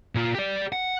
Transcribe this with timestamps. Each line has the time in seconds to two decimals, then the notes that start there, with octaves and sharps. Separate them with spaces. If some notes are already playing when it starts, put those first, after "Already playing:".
0.15 A#2 F4
0.35 G4 D5
0.72 F#5